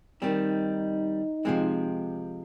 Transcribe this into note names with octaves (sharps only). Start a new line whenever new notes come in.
D#3 G3 C4 D#4
C3 F3 G#3 C4